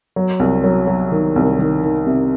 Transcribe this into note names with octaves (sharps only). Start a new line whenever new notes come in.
F#3
C2
F#3
F#3
D#3
C2
D#3
D#3
C3